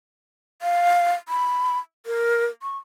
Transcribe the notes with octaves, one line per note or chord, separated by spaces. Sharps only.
F5
B5
A#4
C#6